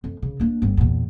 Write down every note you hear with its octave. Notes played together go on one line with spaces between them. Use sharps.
F2
C#3
A#3 D4
G1 C4
E2 A#2